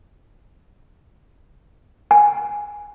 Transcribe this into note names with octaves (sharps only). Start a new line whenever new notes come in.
G#5